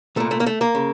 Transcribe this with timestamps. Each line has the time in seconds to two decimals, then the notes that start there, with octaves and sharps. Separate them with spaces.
0.16 C2 A#2 A3
0.31 A3
0.40 A#3
0.46 A3
0.61 A#3
0.75 C#3